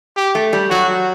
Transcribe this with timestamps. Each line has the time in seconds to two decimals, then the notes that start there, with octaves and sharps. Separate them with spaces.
0.17 G4
0.35 A3
0.53 G3
0.71 F#3 F#4